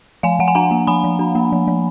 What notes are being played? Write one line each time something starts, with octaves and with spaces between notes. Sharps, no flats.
F3 F5 G#5
F3 F#5
G#5
D4 F#5 A#5
A#3
F3 G#5 B5
F3
D4
A#3
F3
F3